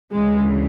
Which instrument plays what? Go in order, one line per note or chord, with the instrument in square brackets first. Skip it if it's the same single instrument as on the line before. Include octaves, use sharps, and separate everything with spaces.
[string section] D2 C#3 E3 G#3